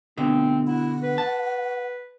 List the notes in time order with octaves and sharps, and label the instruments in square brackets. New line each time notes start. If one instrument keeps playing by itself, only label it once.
[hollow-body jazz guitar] B2 D3 [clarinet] C4
[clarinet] E4 [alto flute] F#5
[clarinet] B4
[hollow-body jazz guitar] A5